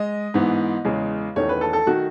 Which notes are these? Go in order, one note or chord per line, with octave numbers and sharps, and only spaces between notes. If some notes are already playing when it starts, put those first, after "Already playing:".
Already playing: G#3 D#5
G#2 E3 B3
E2 C#3 G#3
E1 E2 D#3 A3 C#4 C#5
B4
A4
A4
D#3 A3 F#4